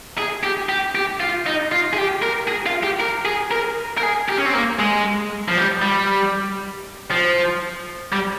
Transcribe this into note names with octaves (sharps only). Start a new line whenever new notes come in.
G#4
G4
G4
G4
F4
D#4
F4
G#4
G4
A#4
G#4
F4
G4
A#4
G#4
A#4
A#4
G#4
G4
C#4
C4
A#3
G#3
F3
G3
G3
F3
G3